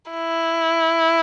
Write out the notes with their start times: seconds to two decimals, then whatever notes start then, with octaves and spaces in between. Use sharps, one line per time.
0.11 E4